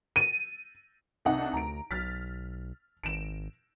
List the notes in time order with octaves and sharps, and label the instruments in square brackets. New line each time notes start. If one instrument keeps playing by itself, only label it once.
[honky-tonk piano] D#7
C2 D#4 F#5
[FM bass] D4
[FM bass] D2 [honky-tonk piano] A#5 D7
[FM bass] B1 [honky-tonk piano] F6 A6 B6
[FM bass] G#1 [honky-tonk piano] D7 E7